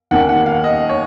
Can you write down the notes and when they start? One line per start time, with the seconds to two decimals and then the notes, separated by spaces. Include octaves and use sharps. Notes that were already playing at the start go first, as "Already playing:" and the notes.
0.11 D#2 D#3 A#3 C#4 F#5
0.29 F#5
0.46 F5
0.64 D#5
0.89 C#5